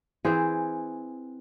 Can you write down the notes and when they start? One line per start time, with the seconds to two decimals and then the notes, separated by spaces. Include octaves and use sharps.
0.25 E3 C4 G#4 C5